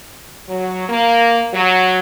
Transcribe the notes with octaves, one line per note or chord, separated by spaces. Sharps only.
F#3
A#3
F#3